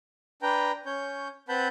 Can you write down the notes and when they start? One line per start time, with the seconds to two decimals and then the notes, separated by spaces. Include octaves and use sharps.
0.42 D4 B4 G5 A#5
0.86 C#4 C#5 G6
1.49 C4 B4 F#5 A5 B5 G6